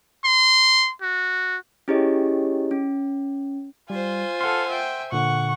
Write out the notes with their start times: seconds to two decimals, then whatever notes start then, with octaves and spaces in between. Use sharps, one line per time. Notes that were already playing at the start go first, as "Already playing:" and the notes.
0.24 C6
1.01 F#4
1.88 C#4 E4 G4 G#4 C#5 D#5
2.71 C#4
3.90 G3 F4 C5 G#5
4.41 A4 F5 F#5 C6
4.69 E5 G5
5.12 A#2 D3 F#5 C#6